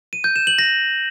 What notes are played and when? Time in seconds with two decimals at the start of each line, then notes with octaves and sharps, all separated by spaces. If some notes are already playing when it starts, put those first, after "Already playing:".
0.13 D#7
0.24 G6
0.36 E7
0.47 F#7
0.59 A#6